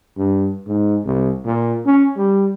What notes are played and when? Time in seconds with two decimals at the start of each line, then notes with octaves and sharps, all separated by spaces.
0.17 G2
0.67 G#2
1.05 C2
1.45 A#2
1.86 C#4
2.17 G3